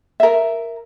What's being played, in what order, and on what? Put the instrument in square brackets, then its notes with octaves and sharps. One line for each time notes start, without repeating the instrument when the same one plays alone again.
[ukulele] A#4 E5